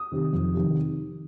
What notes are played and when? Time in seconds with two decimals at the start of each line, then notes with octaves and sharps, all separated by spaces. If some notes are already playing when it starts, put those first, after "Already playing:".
Already playing: D#6
0.12 C3 D#3
0.33 F2
0.54 C3 D#3